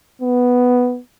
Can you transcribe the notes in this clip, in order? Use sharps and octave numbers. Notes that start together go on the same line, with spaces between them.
B3